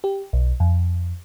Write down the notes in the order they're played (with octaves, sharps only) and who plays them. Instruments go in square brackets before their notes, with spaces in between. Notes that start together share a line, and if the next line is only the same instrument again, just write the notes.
[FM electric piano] G4
B1
F2